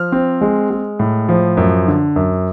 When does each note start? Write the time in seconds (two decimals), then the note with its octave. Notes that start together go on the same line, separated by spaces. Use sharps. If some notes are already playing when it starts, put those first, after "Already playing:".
Already playing: F3 F6
0.12 C4
0.41 G#3
0.70 G#3
1.00 A2
1.29 F3
1.57 F#2
1.87 D3
2.16 F#2